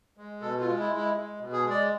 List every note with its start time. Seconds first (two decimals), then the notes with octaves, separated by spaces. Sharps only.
0.17 G#3
0.41 B2 A4
0.61 F4
0.66 G#3
0.79 E4
0.91 G#3
0.96 E4
1.15 G#3
1.40 B2
1.52 G#4
1.64 G#3
1.70 D5